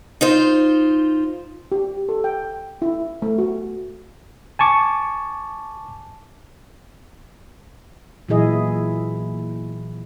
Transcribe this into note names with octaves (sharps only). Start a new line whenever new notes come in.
D#4 F4 C5
G4
A4
G5
E4
A3
F#4
G#5 A5 C#6 D6
A#2 E3 F#3 E4 G#4 D#5